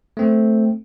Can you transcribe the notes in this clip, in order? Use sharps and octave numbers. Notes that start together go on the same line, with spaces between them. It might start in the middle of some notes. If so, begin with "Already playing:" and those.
A3 C4